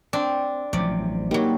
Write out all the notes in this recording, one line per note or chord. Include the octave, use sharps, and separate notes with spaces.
C4 D4
A1 C3 F3 F#3 D5
F#3 G3 A#3 D#4 G4